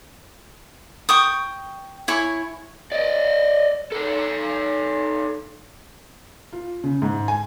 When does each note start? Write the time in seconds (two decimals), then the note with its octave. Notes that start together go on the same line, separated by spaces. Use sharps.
1.09 G5 C#6 D#6
2.08 E4 C#5 G#5 C#6
2.92 D5 D#5
3.92 D#4 A4
6.53 F4
6.84 C#3
7.02 G#2
7.28 G#5